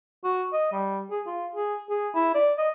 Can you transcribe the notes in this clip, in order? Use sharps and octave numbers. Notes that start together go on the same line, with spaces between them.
F#4
D#5
G3
G#4
F4
G#4
G#4
E4
D5
D#5